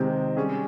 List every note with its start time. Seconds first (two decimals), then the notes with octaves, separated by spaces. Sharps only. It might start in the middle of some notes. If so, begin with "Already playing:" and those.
Already playing: C3 D#3 G#3 C4
0.37 G3 C#4 G#4